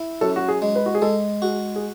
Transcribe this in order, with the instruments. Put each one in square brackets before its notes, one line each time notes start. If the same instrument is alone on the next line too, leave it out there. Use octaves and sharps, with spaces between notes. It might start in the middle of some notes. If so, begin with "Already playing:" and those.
Already playing: [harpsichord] E4
[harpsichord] F#2 [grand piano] A4
[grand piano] F#4
G#4
[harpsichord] G#3
[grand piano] B4
F#4
G#4
[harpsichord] G#3 [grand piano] A4
[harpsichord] F#4 [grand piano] G#4
[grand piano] G#4